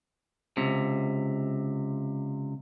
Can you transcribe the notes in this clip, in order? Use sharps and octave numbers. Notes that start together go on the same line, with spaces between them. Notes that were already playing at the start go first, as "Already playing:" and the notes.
C#2 C3